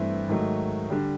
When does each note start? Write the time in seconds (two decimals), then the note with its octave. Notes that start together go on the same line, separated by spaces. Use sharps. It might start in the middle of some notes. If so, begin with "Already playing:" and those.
Already playing: G2 E3 A3 C4 E4
0.28 G#2 D#3 F#3 A3
0.90 D3 G3